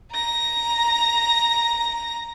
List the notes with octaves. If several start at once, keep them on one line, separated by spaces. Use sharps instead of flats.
A#5 A#6